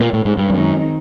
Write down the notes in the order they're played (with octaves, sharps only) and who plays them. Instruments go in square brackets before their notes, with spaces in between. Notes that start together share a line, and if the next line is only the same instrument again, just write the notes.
[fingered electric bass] A#2
A2
G#2
G2
[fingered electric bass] F#2 [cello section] D#3 G#3 C4 D#4